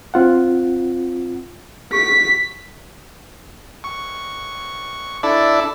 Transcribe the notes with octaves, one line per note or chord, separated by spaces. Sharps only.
C4 F4 F#5
C#6 B6
C#6
D4 E4 A4 D5